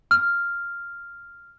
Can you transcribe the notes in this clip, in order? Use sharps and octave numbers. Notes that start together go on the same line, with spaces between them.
F6